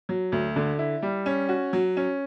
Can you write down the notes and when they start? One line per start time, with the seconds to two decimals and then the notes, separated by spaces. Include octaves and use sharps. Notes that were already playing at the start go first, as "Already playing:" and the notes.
0.09 F#3
0.32 D2
0.56 D3
0.79 E4
1.02 G3
1.26 C#4
1.49 F#4
1.73 F#3
1.97 C#4